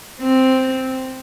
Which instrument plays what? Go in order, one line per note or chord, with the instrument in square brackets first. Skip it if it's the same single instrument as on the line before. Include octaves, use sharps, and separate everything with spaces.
[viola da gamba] C4